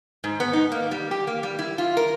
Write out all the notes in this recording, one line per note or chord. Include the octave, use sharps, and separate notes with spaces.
G#2
B3
D#4
A#3
G3
G4
A#3
G3
E4
F4
A#4